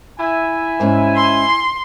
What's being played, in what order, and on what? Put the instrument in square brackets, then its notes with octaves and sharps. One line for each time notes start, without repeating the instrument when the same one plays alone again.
[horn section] E4 E5 G#5
[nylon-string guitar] G#2 C#4
[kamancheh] C6